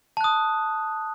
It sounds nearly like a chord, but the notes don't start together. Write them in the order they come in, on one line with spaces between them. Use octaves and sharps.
A5 F#6 D#6